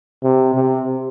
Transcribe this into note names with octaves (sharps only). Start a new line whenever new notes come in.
C3
C3